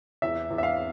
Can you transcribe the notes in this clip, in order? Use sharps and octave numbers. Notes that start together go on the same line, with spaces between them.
E2 E5
E2
E5
F5